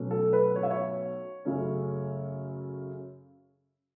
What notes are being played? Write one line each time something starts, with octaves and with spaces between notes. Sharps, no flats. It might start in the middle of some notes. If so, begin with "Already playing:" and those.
Already playing: B1 B2 A3 C#4
A4
B4
C#5
E5
C#5
F#2 C#3 A3 C#4